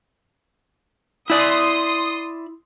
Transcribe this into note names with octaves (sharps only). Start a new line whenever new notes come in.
E4 D5 C6 D#6